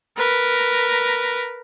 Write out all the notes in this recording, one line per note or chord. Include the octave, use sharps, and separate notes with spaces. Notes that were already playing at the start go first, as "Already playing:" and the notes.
A#4 B4